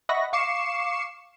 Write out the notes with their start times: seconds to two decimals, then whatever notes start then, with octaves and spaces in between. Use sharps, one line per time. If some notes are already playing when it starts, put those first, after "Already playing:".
0.09 D#5 E5 F#5 B5 C#6 A#6
0.33 F5 C#6 D6 C7 C#7 E7